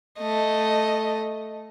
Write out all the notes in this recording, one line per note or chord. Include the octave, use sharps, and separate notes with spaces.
A3 D#5